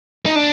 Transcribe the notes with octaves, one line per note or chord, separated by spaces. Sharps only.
D#4
D4